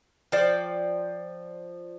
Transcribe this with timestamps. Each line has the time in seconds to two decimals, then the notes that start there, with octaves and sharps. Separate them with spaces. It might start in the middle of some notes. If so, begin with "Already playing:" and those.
0.32 F3 C5 D5 G5